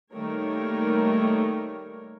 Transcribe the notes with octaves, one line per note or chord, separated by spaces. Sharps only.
D#3 G3 A3 A#3 A#4 C#5